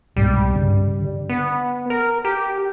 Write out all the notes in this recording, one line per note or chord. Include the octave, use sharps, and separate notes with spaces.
C2 G#2 B2 G3
G2 C#3
D3
B3
A#4
G4